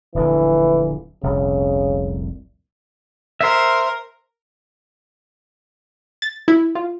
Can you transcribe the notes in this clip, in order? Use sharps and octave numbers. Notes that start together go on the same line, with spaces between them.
D1 A#1 D3 E3
F1 C2 A#2 C#3
A#4 C5 E5
A6
E4
F4